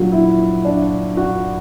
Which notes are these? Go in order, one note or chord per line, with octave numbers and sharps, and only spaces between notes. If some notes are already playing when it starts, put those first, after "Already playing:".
Already playing: A#1 A#2 F#3 F#4
E4
D4
F#4